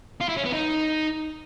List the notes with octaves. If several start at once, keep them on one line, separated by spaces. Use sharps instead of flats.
F4
E4
C#4
B3
D#4